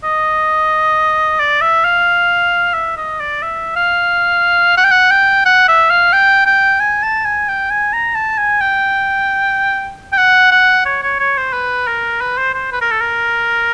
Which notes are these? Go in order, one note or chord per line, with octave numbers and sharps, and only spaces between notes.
D#5
D5
E5
F5
E5
D#5
D5
E5
F5
F#5
G5
F#5
G5
F#5
E5
F5
G5
G5
G#5
A5
G#5
G5
G#5
A#5
A5
G#5
G5
G5
F#5
F#5
C#5
C#5
C#5
C5
B4
A#4
B4
C5
C5
B4
A#4
A4
A#4